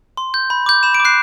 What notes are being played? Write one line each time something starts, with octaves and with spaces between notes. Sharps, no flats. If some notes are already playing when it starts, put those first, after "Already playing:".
C6
G6
B5
D6 G6
B5 E7
D7
D6
F#6 C7